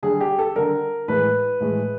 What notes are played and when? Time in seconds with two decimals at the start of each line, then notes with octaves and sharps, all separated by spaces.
0.03 D3 G3 G#4
0.21 G4
0.39 A4
0.56 D3 G3 A#4
1.08 A2 E3 G#3 B4
1.60 A2 E3 G#3